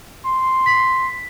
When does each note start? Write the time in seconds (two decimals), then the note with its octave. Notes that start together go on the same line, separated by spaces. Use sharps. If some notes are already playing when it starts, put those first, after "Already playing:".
0.25 C6
0.66 B6